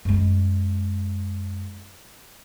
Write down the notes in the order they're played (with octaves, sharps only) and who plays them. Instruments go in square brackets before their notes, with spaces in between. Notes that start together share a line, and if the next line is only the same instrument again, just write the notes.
[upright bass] F#2 G#3